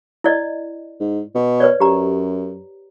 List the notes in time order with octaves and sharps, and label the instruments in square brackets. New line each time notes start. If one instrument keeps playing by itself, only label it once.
[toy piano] E4 D5 D#5
[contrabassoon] G#2
B2
[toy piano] B4 C#5 D5
[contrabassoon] F#2 [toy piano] G4 A#5